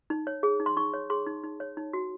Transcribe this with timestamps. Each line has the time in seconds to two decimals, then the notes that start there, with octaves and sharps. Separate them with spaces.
0.10 D#4
0.27 C#5
0.43 G#4
0.60 D#4
0.66 C6
0.77 D#4 C#6
0.94 C#5
1.10 G#4 C6
1.27 D#4
1.44 D#4
1.60 C#5
1.77 D#4
1.93 F#4